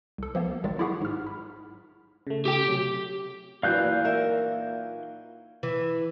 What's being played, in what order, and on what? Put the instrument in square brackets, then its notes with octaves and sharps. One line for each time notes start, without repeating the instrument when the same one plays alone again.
[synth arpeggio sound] C2 A4
F3 A#3 B3
G#1 D#3 F#3 G#3 A6
E4 F4 G4 G#4 F#5 C#6
G#2 F6
B5
[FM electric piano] C#3 A3
[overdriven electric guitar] G4 G5
[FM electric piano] C3 F#3
[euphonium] A#2 [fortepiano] E3 F#3 D4 [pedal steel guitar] F5 F#6 G6
[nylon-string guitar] D#4 A#4 E5
[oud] E3